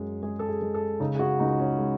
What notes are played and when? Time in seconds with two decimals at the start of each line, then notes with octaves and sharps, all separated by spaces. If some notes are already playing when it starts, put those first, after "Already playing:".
Already playing: F#2 G#3
0.23 G#3 G#4
0.39 A4
0.48 G#4
0.62 G#3
0.74 A4
1.00 C#3 D#4
1.15 G#4
1.19 F#4
1.39 C#2 D#4
1.60 C#4
1.78 G#3